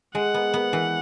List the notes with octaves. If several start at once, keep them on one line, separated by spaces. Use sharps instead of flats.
G#3 F#5
B3
B3
E3